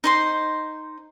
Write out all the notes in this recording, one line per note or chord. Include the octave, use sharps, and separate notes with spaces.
D#4 C5 C6